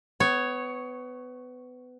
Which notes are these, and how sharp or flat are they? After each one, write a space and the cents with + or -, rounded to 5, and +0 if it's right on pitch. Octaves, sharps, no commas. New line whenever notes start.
B3 +25 C#5 +0